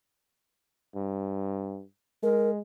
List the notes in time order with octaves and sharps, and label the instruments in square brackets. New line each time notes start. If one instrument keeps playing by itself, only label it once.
[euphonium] G2
[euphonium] G#3 [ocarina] A#4